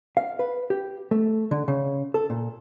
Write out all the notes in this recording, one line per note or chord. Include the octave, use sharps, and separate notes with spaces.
F5
B4
G4
A3
D3
C#3
A4
A#2